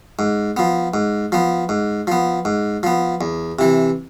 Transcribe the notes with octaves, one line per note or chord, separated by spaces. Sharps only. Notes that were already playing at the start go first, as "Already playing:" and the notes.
G#2
F3 B3
G#2
F3 B3
G#2
F3 B3
G#2
F3 B3
E2
C3 E3